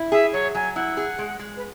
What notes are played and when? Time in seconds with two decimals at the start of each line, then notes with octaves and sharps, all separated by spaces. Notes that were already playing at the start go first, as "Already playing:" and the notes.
Already playing: E4
0.12 G#4 E5
0.33 F#3 C#5
0.55 F#3 G#5
0.75 E4 F#5
0.97 G#4
1.19 G#3
1.39 G#3
1.57 B4